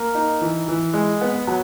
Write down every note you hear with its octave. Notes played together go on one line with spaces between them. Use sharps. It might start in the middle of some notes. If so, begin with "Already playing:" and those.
Already playing: A#3
D#4
E3
E3
G#3
B3
F#3